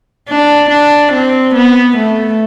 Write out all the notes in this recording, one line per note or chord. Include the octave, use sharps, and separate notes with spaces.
D4
D4
C4
B3
A3